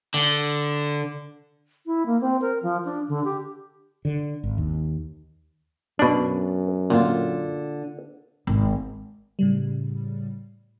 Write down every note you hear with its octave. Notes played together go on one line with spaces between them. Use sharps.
D3
E4
A#3
C4
A#4
F3
D4
D3
G4
D3
G#1
D#2
F#2 B2 D4
A#2 D3 F4
G#1
A2 C#3 G3